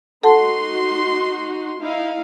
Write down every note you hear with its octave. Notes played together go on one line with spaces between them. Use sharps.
D#4 F#4 A4 F#5 A5 C6
D#4 E4 F5